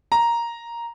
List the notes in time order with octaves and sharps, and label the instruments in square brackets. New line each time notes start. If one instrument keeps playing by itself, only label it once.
[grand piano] A#5